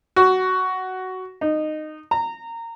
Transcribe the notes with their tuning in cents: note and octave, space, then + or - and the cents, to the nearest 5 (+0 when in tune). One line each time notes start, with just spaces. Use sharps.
F#4 +10
D#4 -15
A#5 -20